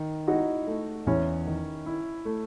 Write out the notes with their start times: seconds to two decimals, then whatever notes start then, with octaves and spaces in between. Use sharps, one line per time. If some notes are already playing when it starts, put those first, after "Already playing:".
Already playing: D#3
0.28 D#4 E4 F#4
0.67 A3
1.06 E2 C#4 E4
1.46 D#3
1.86 E4
2.25 A3